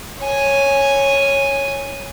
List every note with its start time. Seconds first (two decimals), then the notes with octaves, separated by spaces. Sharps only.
0.20 C#5 G#5